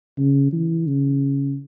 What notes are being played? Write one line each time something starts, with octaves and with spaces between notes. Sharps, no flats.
C#3
E3
C#3